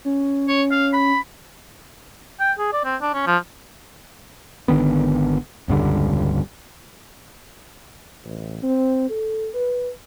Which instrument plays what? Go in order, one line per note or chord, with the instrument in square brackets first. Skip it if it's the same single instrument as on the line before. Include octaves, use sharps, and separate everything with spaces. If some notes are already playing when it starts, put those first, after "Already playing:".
[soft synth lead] C#4
[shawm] C#5
F5
B5
[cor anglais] G5
G#4
D5
C4
D4
C#4
F3
[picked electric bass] G#1 D3 D#3 B3
E1 C#2 G2 D3
[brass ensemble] A1
C4
A4
B4